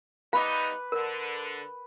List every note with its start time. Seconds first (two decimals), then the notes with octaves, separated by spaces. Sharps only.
0.33 G3 B3 D#4 B4 F5 B5 D6
0.92 D3 A#4